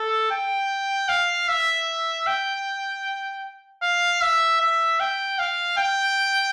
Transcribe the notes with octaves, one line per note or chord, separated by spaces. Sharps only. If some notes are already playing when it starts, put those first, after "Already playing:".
Already playing: A4
G5
F5
E5
G5
F5
E5
E5
G5
F5
G5